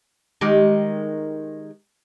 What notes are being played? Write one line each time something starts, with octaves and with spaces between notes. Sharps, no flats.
D#3 G#3 G4